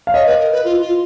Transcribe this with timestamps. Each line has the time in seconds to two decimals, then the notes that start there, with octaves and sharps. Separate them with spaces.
0.07 F5
0.14 C#5 D#5
0.26 B4
0.39 A#4
0.52 B4
0.65 F4
0.81 F4